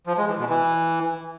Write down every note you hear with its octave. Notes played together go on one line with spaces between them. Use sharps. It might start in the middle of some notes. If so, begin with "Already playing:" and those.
F3
G#3
E3
B2
E3